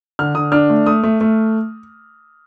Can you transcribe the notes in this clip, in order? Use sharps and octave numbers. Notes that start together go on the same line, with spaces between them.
D3 F6
D3 D#6
D4 F6
A3
A3 D#6
A3
A3